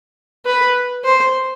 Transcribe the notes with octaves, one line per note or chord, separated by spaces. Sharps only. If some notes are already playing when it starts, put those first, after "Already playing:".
B4
C5